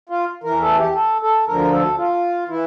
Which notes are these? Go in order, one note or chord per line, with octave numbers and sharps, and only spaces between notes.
F4
E2 E3 A#4
A4
G4
A4
A4
D2 D3 F3 A#4
A4
F4
E3 E4